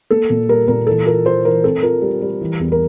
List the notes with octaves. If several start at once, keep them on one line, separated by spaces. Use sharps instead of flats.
A#3 A4
A#2
G3 A#4
A#2 A#4
E3 A4
F4 A#4
F4 C5
E3 A#4
C4 A4
F4 A#4
G3
G3
E3
E2
A#4